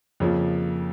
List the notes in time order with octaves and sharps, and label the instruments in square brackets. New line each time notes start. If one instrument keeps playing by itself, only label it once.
[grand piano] F2 C#3 F3 A#3